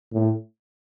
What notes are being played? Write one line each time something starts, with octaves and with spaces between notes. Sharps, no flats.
A2